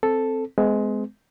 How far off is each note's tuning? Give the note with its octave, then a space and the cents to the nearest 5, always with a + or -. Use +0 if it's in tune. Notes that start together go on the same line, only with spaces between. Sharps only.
C4 +0 A4 +0
G#3 +15 B3 +45